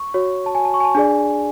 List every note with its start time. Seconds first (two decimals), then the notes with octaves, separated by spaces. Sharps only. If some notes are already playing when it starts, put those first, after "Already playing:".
Already playing: C#6
0.14 F#4 C#5
0.46 A5
0.55 G#5
0.65 A5
0.74 C#6
0.80 G#5
0.85 A5
0.95 D4 G#4 D5 G#5